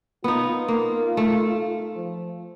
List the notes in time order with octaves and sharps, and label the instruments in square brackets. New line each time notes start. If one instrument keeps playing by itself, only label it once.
[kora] B3 D#4 [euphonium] F4
[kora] A#3
A3
[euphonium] F3